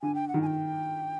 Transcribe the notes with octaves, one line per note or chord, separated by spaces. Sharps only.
D3 G#5
G5
F#5
D#3
G#5
G5